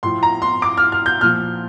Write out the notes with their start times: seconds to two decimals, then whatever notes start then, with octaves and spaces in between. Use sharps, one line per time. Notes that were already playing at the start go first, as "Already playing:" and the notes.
0.03 A2 F3 C6
0.23 A#5
0.42 C6
0.62 D6
0.77 F6
0.92 F6
1.06 G6
1.21 A#2 F3 F6